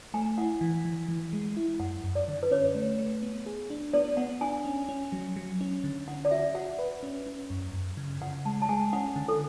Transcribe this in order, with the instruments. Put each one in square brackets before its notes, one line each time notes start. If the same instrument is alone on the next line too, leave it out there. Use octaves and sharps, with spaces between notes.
[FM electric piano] A3 [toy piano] G#5
[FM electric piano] E4 [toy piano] F#5
[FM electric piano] E3
E3
E3
G#3
E4
[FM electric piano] F#2 [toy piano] F#5
[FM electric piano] F#2
[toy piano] D5
[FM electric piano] D3
[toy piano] B4
[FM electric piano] C#4 [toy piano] C#5
[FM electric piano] A3
A3
B3
G#4
D4
[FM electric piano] B3 [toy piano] D5
[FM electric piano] B3 [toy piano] F#5
[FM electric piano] D4 [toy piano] G#5
[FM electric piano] C#4
C#4
F#3
F#3
C#4
D3
[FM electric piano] C#4 [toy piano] F#5
[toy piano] D5
[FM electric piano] F#4 [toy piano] E5
[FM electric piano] F#4 [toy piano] F#5
[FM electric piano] B4
C#4
C#4
F#2
F#2
C#3
[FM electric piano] C#3 [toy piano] F#5
[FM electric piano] G#3 [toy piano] A5
[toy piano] A5
[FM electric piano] G#3 [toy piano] G#5
[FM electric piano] C#4 [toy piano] F#5
[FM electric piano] D3
[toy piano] A4